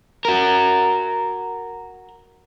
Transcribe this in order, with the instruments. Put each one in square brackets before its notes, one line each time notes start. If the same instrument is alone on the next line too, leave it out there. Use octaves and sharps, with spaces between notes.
[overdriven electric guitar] F#4 A#4